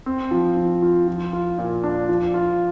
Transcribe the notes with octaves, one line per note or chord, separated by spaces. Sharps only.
C4
F3
F3
F4
F3
F4
A#2
D4
F3
F4